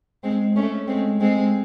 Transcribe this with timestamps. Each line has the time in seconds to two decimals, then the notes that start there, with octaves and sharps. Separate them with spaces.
0.23 G#3 C4
0.56 A3 C#4
0.88 G#3 C4
1.20 G#3 C4